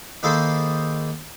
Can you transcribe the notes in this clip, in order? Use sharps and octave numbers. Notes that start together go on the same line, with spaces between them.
D#3 A#3 E4 G#4 A4 C5